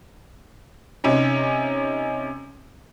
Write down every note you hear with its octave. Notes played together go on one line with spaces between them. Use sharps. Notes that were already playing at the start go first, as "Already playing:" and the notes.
C3 C#4 D#4